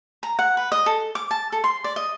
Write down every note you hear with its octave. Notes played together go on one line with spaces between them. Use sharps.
A#5
F#5
B4
D#5
A4
D6
A5
A4
C6
D5
D#5